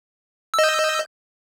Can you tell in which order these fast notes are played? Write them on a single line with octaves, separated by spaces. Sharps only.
E6 D#5 G6